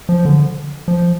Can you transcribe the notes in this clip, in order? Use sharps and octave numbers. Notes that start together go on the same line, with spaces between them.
F3
D3
F3